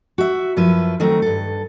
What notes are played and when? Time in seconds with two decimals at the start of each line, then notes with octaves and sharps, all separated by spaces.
0.18 F#4 E5
0.56 F#2 F3 E4 B4
1.00 D#3 F#3 A3 C4 A#4
1.22 G2 A4